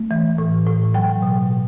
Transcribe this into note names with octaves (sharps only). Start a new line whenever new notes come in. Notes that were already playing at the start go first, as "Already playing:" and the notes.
Already playing: A3
E3
A2
A2
F#3 G5
B2